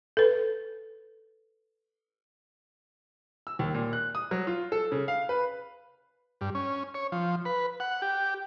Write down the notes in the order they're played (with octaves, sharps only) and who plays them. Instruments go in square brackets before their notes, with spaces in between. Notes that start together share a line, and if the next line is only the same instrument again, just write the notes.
[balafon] A4 B4
[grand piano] E6
D#2
A#2
F#6
D#6
F#3
F4
A4
C#3
F5
B4
[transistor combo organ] G2
C#4
C#5
F3
B4
F#5
G4